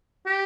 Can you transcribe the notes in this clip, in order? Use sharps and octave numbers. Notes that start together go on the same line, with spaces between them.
G4